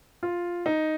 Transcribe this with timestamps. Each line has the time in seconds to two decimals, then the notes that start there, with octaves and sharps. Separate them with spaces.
0.23 F4
0.66 D#4